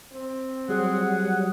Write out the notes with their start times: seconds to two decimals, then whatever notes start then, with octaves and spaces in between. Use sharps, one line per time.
0.13 C4
0.69 F#3 G3 G#4 F#5